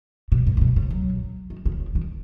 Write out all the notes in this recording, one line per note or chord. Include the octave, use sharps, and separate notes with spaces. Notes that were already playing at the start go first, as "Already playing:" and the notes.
B2
G#2
G#2
B2
C#3
F#3
D#3
C#3
D#3
D#3